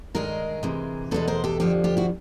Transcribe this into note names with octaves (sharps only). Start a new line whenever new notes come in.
G2 D#3 G#3 G#4 A#4
C3 E3 G#3
E2 B2 G#3 A4 B4
A#4 C5
G4 A4
F2 D3 F3 G4 A4
F4 G4
E4 F#4